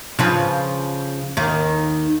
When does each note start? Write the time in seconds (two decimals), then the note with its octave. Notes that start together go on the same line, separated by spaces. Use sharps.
0.19 C#3 F3 B4
1.37 D#2 D#3